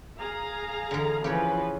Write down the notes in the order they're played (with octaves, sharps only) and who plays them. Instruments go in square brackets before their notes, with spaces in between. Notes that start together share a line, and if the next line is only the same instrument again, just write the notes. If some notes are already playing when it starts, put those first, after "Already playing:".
[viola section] G#4 F5 A#5
[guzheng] D3 E3
[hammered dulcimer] C#3 [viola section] E3 F3 B4 [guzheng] G4 C#5 G5